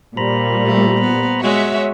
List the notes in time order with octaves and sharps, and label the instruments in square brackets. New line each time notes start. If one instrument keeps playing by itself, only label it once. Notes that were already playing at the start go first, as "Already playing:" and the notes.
[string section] A#2 G3 [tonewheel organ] C5 A#5 B5
[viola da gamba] A3
B3
[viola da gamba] G#3 F#4 [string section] C#5 E5